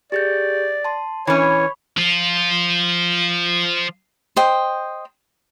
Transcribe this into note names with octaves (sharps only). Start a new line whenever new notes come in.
G4 G#4 D5 G6
A5 C6
E3 C#4 C#5 B5 C#6
F3 F4
C5 D#5 G5